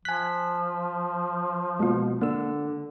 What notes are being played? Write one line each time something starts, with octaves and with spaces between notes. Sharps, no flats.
F3 G#5 F#6 B6
B2 G#3 A#3 F4
D3 A#3 E6